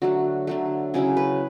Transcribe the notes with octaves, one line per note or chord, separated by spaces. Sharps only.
D3 F#3 A3 F#4
D3 F#3 A3
C#3 F#3 C#4 E4 G#4
B4